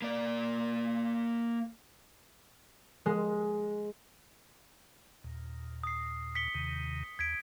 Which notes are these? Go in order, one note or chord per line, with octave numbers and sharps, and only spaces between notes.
A#3 D5
G#3
D#2 A#2
D#6 C7
B6 C#7 G7
D#2 C3 D#3
D#2 G#6 B6 D7